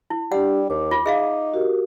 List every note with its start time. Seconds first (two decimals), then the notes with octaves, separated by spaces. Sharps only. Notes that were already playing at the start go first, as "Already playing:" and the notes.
0.10 E4
0.32 G3 D4 G4 F#5
0.70 D#2 D6
0.91 F4
1.06 D#4 G#4 E5 F5
1.54 F#4 G4 A#4